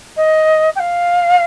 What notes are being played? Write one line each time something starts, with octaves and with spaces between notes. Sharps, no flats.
D#5
G5
F5